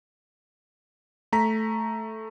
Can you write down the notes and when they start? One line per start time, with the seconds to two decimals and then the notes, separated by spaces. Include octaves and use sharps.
1.32 A3 A#5 B6